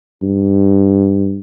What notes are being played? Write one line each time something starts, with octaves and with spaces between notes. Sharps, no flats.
G2